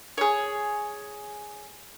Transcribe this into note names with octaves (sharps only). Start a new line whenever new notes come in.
G#4 C#5